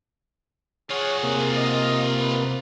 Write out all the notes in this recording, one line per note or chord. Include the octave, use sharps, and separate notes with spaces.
F4 G#4 C#5 F#5
C3 A#3
D#5
B4